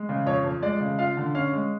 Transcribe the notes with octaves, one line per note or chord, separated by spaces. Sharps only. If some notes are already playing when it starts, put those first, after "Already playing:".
Already playing: G#3
C#3
F2 C#5
F2
G#3 D5
C#3
F4 F5
D3
C#4 F5
G#3